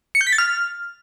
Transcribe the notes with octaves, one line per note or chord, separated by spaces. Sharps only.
C#7
G6
B6
A6
F6